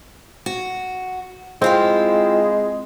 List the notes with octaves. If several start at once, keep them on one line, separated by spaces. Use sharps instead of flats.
F#4
G#3 C4 E4 F4 G4